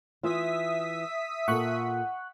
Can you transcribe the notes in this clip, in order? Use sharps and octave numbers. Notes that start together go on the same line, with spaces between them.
E3 F4 E5 D#6 B6
A#2 A4 F#5 C#6 F#6